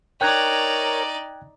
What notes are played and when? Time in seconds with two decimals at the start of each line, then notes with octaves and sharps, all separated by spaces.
0.21 D#4 A#4 C#5 D5 G5 F#6 G#6